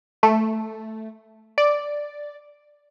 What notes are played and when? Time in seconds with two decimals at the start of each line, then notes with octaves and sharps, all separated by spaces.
0.23 A3
1.58 D5